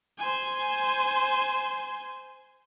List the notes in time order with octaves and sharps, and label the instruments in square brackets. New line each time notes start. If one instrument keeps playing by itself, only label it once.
[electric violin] C5 G#5